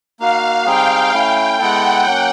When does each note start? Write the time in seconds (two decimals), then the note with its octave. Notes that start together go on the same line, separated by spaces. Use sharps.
0.19 A#3 D#4 F#4 F5
0.66 G3 C4 D#4 G#4 G5
1.13 A3 C#4 E4
1.59 G#3 B3 E4 A4 F#5
2.06 F#3 A#3 C#4